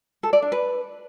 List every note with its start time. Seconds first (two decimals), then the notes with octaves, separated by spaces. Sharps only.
0.23 A4
0.33 D5
0.42 D4
0.52 B4